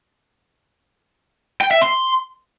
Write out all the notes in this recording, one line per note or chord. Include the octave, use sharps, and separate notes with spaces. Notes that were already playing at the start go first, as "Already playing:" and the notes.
G5
E5
C6